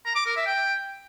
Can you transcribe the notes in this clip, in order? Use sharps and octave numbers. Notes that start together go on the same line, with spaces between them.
A#5
D6
A#4
E5
G5